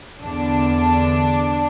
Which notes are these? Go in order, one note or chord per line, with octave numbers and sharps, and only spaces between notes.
E2 D3 D4